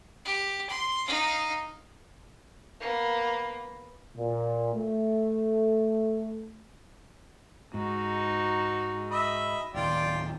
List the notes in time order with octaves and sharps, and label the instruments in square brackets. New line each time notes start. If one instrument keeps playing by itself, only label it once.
[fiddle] G4
C6
D#4 F5
[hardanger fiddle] A#3 B3
[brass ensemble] A#2
A3
[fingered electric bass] G#2 [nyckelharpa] D#4 F#4
[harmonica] D#5 E5 B5
[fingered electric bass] D1 D#3 [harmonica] F4 D5 G5